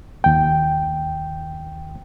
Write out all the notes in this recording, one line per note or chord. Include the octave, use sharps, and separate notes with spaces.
D#2 G5